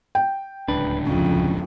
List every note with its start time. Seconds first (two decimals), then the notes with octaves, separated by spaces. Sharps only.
0.15 G5
0.68 D1 C#2 D4 B4
1.07 F2 C#3